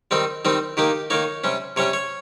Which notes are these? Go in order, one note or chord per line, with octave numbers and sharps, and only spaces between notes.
D#3 G3 C4 D#4
D#3 G3 C4 D#4
D#3 A#3 D#4 G4
D#3 A#3 D#4 C#5
C3 G3 C#4
C3 G3 C#4 C#5
C#5